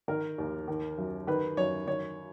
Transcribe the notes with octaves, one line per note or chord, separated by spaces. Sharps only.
D#3 A#4
D#2
D#3
F#2
D#3 B4
F#2 C#5
D#3 C#5